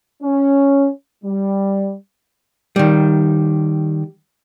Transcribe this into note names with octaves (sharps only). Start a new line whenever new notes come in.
C#4
G3
D#3 G3